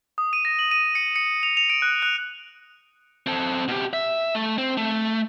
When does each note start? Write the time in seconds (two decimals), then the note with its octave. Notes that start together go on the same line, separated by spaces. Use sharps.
0.18 D#6
0.33 D#7
0.45 A#6
0.59 F#7
0.71 D#7
0.95 C#7
1.16 C#7
1.43 F7
1.57 F7
1.70 D7
1.82 F#6
2.02 F#6
3.27 C4 A4
3.68 B2 G4
3.93 E5
4.35 A3
4.58 C4
4.77 A3